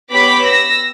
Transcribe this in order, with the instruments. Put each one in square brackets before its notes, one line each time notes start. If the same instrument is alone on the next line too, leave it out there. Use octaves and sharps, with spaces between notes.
[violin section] B3 G4 C#5 B5 D6 B6
E6 A#6